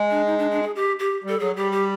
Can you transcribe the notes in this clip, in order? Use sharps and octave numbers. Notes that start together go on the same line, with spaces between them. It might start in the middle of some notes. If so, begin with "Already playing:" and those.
Already playing: G#3
D4
D#4
D4
D4
G#4
G4
G4
G3 A4
F#3 G#4
G3 G4
G4